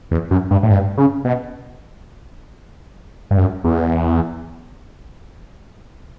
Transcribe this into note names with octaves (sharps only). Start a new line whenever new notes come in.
E2
F#2
G2
A2
G2
C#3
B2
G2
F#2
E2